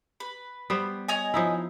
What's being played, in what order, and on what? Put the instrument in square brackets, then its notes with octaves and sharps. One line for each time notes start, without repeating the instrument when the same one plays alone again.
[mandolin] B4
[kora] G3 B3 C5
[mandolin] C#5 D#5 G#5
[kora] F3 D#4 E4